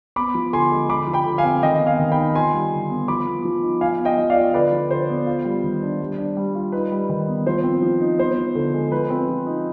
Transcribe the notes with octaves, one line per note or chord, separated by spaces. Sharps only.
B3 B5 D6
F3
D3 G#5 C6
G#3
D3 B5 D6
F3
G5 B5
D3
F5 G#5
C4
D#3 D#5 G5
B3
F5 G#5
D#3
G5 B5
D#4
F4 G#5 C6
G3
D3
B3
F3 B5 D6
B3
F3
D#4
F3 F5 G#5
B3
D#5 G5
F3
D5 F5
F4
D3 B4 D5
F3
D3 C5
B3
F4
G3
D#3
D4
G3
D4
G3
F4
D#4 B4
G3
D#3
B3
F3 C5
C4
F3
D#4
B3 C5
F3
D3
G#3
F3 B4
C4
F3
D#4